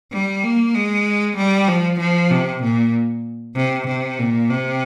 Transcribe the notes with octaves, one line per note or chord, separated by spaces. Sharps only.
G3
A#3
G#3
G3
F3
F3
C3
A#2
C3
C3
A#2
C3